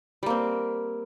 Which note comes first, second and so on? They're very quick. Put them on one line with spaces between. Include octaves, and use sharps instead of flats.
G3 A#3 C4